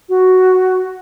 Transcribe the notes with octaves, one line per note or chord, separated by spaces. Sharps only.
F#4